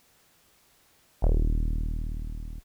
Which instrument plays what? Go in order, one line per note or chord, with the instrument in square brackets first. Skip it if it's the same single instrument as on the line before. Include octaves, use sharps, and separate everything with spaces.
[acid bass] D#1